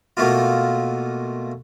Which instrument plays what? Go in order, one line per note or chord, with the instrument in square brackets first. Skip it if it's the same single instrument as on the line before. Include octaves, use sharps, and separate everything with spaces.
[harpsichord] B2 A3 A#3 F4